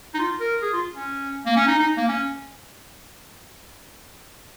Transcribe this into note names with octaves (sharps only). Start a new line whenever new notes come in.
D#4
F4
A#4
G#4
F4
C#4
A#3
C#4
D#4
D#4
A#3
C#4